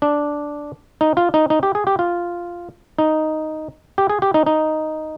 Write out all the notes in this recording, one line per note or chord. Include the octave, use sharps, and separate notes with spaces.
D4
D#4
F4
D#4
D#4
G4
G#4
G4
F4
D#4
G4
G#4
G4
D#4
D#4